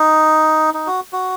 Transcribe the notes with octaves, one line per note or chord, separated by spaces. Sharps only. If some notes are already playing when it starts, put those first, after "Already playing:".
Already playing: D#4
D#4
F#4
F#4